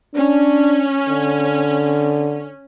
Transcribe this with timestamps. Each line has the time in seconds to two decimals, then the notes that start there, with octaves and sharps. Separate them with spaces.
0.15 C#4 D4
1.09 D3